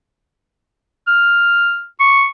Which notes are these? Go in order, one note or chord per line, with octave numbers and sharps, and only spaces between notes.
F6
C#6